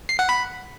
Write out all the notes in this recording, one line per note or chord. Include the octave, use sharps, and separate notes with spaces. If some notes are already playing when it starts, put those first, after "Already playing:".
C7
F#5
B5